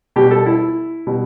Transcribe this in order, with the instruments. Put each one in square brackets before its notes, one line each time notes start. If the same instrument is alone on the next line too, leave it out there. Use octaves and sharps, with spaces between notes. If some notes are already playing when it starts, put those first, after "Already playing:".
[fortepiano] B2 G3 G4
A4
E4
B2 G3